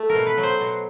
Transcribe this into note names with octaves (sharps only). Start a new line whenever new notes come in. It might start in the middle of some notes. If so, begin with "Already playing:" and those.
Already playing: A3
A#4
B2
B4
F#3
C5
B2